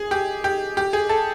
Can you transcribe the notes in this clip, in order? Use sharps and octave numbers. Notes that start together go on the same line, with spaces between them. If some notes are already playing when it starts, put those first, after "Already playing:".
Already playing: G#4
G4
G4
G4
G#4
A4